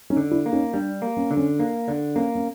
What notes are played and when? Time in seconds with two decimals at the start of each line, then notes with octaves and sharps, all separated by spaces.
0.10 C#4 D#4
0.17 D3
0.31 D4 E4
0.46 A#3
0.53 C#4 D#4
0.73 G3 D4
1.02 A#3
1.17 C#4
1.31 D3
1.37 C#4
1.59 A#3 D4
1.88 D3 D4
2.16 A#3 C#4
2.35 C#4